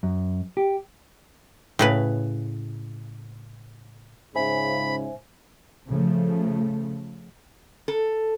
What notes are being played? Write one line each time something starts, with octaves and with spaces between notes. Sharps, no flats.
F#2
G4
A2 C#3 B4
C#2 G#2 C#3 C5 E5 G#5 B5
C#3 F3 A3
A4